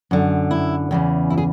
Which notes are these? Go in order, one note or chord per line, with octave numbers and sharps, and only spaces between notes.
F#2 D3
E4
E2 C#3 E3
E4
G#4